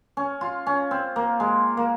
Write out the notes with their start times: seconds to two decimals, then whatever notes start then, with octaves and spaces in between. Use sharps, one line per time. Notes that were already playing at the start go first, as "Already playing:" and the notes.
0.17 C#4
0.41 F4
0.66 C#4
0.91 C4
1.16 A#3
1.40 G#3
1.77 A#3